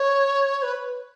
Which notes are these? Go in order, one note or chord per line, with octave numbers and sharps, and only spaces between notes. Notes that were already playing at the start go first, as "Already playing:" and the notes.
Already playing: C#5
B4